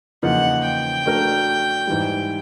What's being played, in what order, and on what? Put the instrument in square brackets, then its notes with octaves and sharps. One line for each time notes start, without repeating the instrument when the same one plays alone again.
[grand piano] E2 C#3 F3 A#3 D#4 [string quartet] F#5
[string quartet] G5
[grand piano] A3 D4 F#4 A#4
G#2 E3 G3